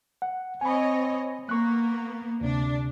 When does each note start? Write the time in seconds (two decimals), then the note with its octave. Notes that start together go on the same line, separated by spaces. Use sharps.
0.22 F#5
0.61 C4 C#5 D#5 G#5 B5
1.49 A#3 B3 C#6 F#6
2.41 D2 C3 D4